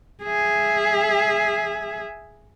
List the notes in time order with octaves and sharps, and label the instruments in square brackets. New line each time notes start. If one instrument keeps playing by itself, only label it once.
[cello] G#4 E5